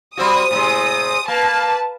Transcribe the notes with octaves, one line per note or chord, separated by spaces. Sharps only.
G3 C4 F#4 D#6
A2 C3 G#3
A#3 B4 A5